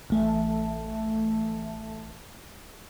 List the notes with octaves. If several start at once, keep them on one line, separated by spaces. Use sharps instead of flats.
A1 A3